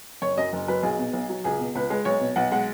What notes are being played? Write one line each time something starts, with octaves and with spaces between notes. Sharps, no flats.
F#1 C#5
F#2 D#5
F#1
F#3 B4
B1 G#4
B2
B1
F#3
C#2 G#4
B2
C#2 B4
G#3
B1 C#5
B2
B1 F#5
G#3 F#5